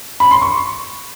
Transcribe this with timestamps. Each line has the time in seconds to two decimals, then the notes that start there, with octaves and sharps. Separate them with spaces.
0.20 B5
0.31 C6
0.42 C#6